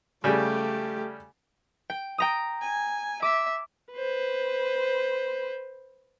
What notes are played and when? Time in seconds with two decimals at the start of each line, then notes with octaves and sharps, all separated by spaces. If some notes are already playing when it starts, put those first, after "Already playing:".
0.24 C#3 G3 A3 G4 G#5
1.90 G5
2.18 G5 A#5 D#6
2.62 G#5
3.22 E5 D6
3.93 B4 C5